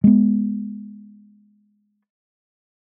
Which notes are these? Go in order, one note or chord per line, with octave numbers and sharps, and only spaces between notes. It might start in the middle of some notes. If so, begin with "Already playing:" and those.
G#3 B3